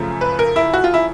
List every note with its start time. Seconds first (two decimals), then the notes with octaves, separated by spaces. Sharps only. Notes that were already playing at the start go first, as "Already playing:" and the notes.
Already playing: F#2 C#3 F3 A3
0.21 B4
0.39 A#4
0.56 E4
0.74 F#4
0.84 F4
0.94 E4